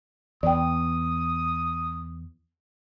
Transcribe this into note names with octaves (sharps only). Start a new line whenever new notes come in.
E2 D5 G5 D#6